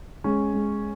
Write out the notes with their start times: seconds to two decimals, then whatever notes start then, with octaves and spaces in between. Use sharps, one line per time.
0.24 G#3 C#4
0.54 G#3